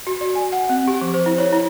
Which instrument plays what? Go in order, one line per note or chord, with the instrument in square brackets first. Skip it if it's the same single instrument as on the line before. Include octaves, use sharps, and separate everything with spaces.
[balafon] F#4
D5
G#5
F#5
C4
G4
F3
C5
E4
C#5
E4